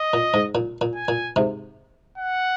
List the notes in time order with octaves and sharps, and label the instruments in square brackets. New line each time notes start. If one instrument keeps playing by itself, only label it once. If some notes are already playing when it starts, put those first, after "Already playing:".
Already playing: [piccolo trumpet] D#5
[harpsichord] A#2
G#2
A#2
A#2
[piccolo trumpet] G#5
[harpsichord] A#2
G#2 C3
[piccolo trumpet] F#5